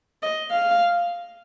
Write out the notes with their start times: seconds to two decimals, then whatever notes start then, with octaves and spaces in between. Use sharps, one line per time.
0.23 D#5
0.51 F5